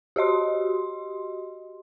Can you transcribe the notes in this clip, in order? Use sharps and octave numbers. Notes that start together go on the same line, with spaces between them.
F#4 G4 D#5 C6